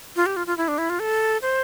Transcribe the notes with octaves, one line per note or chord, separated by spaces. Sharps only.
F4
G4
F4
F4
E4
D4
E4
F4
A4
C5